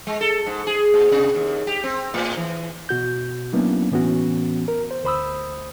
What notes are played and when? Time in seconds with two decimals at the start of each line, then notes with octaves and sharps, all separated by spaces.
0.07 G#3
0.21 A4
0.46 G#2
0.67 G#4
0.94 A#2
1.12 C3
1.35 D#2
1.67 G4
1.84 C4
2.14 A2
2.37 E3
2.89 B2 F#4 G6
3.53 F#3 A#3 B3 C#4 D4 E4
3.92 A2 E3 B3 C#4 F#4
4.68 A#4
4.91 C5
5.04 D2 C5 B5 D#6 E6